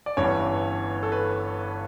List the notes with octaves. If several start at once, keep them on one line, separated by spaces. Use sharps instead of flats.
D5
G1 G2 E3 C#4 C#5
A4
B4